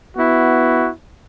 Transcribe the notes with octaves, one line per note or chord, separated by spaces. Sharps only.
B3 E4 F#4